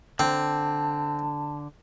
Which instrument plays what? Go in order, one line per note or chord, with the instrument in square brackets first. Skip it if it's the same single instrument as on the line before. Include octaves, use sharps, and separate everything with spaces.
[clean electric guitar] D3 [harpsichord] C4 [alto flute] A5